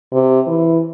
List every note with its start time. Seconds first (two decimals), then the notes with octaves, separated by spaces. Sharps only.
0.12 C3
0.47 E3